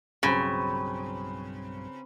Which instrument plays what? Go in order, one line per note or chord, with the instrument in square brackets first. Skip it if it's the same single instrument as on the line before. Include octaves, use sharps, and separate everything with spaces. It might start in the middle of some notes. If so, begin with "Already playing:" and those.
[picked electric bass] B1 G2 F#3 [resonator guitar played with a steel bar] C#3 [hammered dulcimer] C4 B4 A#5